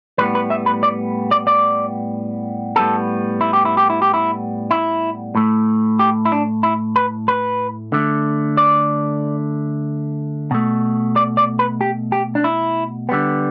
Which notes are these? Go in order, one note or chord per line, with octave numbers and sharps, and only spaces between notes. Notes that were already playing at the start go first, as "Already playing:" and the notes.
A2 G3 B3 B4
B4
E5
B4
D5
D5
D5
A2 G3 B3 A4
E4
G4
E4
G4
E4
G4
E4
E4
A2 A3
G4
E4
D4
E4
B4
B4
D3 A3
D5
B2 A3
D5
D5
B4
G4
G4
D4
E4
D3 G3 B3